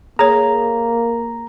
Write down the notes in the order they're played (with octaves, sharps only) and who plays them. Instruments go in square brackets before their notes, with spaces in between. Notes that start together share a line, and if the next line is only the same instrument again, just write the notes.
[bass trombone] A#3 [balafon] G#4 C#5 [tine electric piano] A#5